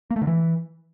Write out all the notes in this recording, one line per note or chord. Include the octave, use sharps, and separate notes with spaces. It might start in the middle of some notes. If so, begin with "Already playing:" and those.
A#3
A3
D3
E3